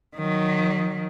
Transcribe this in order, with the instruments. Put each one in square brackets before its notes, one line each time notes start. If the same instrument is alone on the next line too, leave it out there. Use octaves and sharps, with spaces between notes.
[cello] D#3 F#3